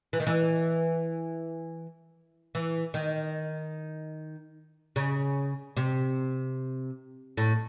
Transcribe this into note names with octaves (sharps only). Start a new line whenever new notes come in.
E3
D#3
E3
E3
D#3
C#3
C3
A2